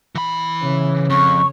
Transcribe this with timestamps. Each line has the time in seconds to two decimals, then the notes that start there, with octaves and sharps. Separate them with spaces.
0.15 E3 B5
0.62 C#3
1.10 F2 C#6